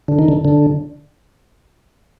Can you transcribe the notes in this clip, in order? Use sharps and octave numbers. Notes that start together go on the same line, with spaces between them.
D3
D#3
D3
D3